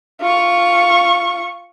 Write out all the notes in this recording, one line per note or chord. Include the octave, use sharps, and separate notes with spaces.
F4 C#6